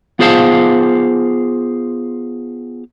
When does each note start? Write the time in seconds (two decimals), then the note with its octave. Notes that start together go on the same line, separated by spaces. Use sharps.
0.19 B3 F4 G#4 C5 F5 A5